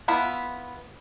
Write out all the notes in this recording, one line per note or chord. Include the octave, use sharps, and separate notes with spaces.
B3 E4 F4 E5 B5